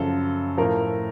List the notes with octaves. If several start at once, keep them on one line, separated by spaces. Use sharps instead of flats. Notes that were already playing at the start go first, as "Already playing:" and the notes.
Already playing: F#2 C#3 F3 A4
A2 F3 A#4